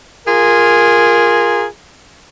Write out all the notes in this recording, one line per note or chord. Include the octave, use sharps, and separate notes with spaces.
F4 G#4 A#4